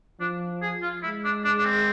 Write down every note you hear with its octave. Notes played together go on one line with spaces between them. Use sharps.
F3 D4
G#4
F4
G#3 E4
D4
D4
D4
C4